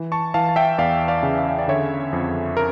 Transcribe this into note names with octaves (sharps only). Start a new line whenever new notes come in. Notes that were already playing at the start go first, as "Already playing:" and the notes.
Already playing: E3
A5 C#6
E3 F5 A5
A5
E5 G5
E2 D5 F5
D5 F5
C#3
F5
E5
D5
D3 C#5 E5
F2
A#4